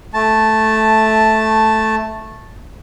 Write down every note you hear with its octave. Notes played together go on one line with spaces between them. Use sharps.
A3 A5